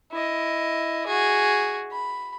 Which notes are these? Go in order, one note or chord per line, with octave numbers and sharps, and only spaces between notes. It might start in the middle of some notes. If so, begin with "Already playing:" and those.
E4 D#5
F#4 G#4
B5